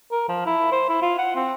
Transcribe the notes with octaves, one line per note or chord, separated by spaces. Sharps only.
A#4
F3
E4
C5
E4
F4
F#5
C4